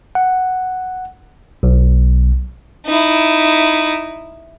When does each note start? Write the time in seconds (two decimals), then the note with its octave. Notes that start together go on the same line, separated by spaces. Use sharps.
0.15 F#5
1.63 B1
2.86 D#4 E4